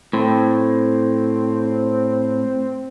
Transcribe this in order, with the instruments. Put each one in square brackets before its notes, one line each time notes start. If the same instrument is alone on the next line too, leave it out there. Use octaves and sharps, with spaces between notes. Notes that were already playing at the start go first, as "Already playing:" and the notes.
[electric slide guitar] A2 [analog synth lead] C4